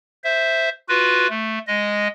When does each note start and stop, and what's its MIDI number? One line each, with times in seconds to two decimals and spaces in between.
0.24 0.69 72
0.24 0.69 76
0.89 1.27 65
0.89 1.27 66
0.89 1.27 71
1.29 1.59 57
1.67 2.08 56
1.67 2.08 75